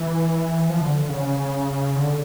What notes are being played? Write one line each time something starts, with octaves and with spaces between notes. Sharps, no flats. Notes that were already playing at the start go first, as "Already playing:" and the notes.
Already playing: E3
F3
D3
C#3
D3